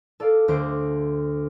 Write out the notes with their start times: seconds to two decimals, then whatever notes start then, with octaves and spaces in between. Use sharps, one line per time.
0.20 A4 D5 F5
0.48 D2 D3 C5 D6 B6